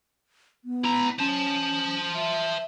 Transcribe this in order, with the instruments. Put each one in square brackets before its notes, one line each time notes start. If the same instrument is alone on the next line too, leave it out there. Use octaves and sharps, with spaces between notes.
[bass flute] B3
[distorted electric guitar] E4 A#5
[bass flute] C#4 [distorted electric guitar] C5 A5
[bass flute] E5